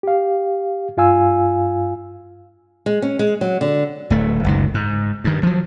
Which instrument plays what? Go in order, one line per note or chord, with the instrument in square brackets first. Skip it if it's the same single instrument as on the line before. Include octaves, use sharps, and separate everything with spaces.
[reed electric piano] G4 F5
G2 F4 F5 G#5 E6
[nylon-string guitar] G#3
C#4
G#3
F#3
D3
[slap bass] D1 A3
F#1 C#2 D#3
G#2
G2 D#3
F3 F#3